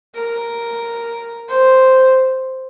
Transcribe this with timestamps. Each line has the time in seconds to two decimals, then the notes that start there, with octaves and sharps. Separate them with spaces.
0.15 A#4
1.49 C5